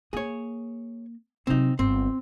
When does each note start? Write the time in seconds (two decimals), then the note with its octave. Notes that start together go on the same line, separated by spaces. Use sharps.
0.13 A#3 G#4 C#5
1.47 C3 F#3 C4 D#4
1.79 G1 C4